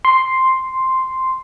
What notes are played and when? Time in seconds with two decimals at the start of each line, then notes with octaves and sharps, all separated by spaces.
0.05 C6